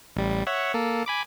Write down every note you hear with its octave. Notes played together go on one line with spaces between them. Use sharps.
A1 G3
C#5 E5 F#5
A#3 A4
G#5 B5 D6